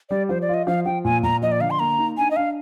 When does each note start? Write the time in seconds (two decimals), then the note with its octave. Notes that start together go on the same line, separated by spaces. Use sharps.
0.10 G3 D5
0.29 F3 C5
0.42 D5
0.49 F4
0.54 D#5
0.67 F3 F5
0.86 F3 G5
1.05 A#2 G#5
1.23 A#2 A#5
1.42 F3 D#5
1.52 D5
1.60 D3 F5
1.71 C6
1.79 A#3 A#5
1.98 D#4
2.18 D4 G#5
2.31 D#5
2.36 D4 F5